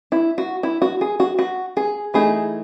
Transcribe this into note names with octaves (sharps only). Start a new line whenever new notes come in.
E4
F#4
E4
F#4
G#4
F#4
F#4
G#4
E3 A3 D#4 G#4